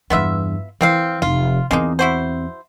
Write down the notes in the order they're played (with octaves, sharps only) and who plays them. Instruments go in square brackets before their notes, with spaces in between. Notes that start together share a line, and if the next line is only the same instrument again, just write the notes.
[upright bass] E2 G2 [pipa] B3 F4 E5
[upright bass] E3 [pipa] A#3 C4 F5
[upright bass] F1 [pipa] F4
[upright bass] E2 C4 [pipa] G#3 A#3 D#4
[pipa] E4 F#4 C5